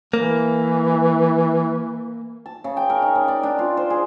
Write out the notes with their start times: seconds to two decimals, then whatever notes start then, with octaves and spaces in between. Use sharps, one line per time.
0.13 E3 A#3
2.46 A5
2.64 C#3
2.77 G5
2.90 A#4
3.02 D#4
3.15 C#3
3.28 D5
3.43 D4
3.59 F4
3.77 C5
3.90 G#4